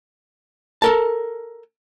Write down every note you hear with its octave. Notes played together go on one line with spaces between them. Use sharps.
A4 A#4 A5